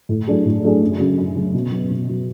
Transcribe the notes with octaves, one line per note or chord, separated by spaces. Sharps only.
A2
F#3 A3 D4 G#4
A2
F#3 A3 D4 G#4
F#2
C#3 F#3
F#2
C#3 F#3
B2
F#3 B3
B2
F#3 B3